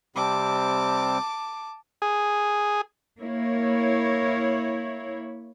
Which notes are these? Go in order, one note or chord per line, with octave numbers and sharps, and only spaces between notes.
C3 G3 C4 A5 D6
G#4
A#3 E4 C#5